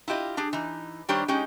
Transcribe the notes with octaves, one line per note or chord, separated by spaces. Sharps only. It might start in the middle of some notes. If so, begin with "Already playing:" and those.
E4 F4 G4 D#5
D4 G4 G#4
E3 D#4
D#3 G3 D4 G4 C5 C#5
G#3 C#4 D#4 G4